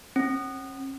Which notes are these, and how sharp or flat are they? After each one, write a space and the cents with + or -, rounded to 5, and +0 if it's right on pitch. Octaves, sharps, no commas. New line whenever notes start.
C#4 -45